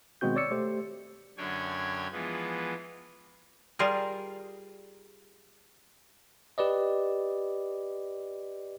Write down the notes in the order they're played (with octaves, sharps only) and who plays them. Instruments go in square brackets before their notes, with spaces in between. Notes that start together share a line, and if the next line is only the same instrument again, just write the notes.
[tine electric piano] B2 D#3 G#3 C4 F#4 G6
C#5 D5 E6 C#7
A3 G4 C5
[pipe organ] F#2 D3 D4 C#5 G5 G#5
E3 F3 G#3 B3
[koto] G3 F4 G#4 A#4
[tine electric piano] G4 B4 D5 D#5